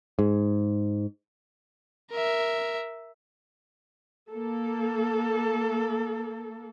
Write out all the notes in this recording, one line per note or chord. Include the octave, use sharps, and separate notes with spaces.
G#2
A#4 E5
A#3 A4